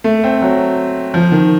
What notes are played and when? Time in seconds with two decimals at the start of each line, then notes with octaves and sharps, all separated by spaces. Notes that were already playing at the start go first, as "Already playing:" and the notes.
0.04 A3
0.24 C4
0.42 F#3
1.14 F3
1.32 D#3